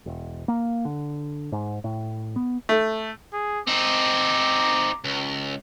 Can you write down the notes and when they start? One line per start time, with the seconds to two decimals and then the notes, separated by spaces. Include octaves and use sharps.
0.06 E1
0.48 A#3
0.85 D3
1.52 G#2
1.84 A2
2.36 B3
2.69 A3
3.33 G#4
3.67 C4 D#4 D6
5.05 C#2